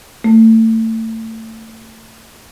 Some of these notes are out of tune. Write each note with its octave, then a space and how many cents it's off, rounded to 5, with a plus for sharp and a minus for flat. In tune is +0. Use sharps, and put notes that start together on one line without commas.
A3 +30